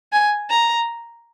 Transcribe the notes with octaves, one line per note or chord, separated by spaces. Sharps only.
G#5
A#5